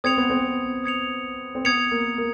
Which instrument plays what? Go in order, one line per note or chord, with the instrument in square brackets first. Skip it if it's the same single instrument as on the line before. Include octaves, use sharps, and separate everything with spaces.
[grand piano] C4 [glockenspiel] D#6 G#6 C#7 F7
[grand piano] B3
C4
[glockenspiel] D#6 G#6 C#7 F7
[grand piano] C4
[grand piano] B3 [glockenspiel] D#6 G#6 C#7 F7
[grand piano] A#3
A#3